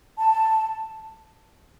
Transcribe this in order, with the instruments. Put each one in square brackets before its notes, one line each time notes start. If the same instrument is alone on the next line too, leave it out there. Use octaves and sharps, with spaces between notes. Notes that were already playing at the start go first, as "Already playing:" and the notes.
[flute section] A5